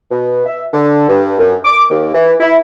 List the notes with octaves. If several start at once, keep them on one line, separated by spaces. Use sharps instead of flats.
B2
E5
D3
G2
F#2
D6
D#2
E3
E4